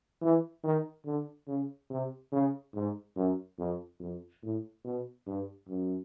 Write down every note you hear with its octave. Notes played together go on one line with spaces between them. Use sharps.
E3
D#3
D3
C#3
C3
C#3
G#2
F#2
F2
F2
A2
B2
G2
F#2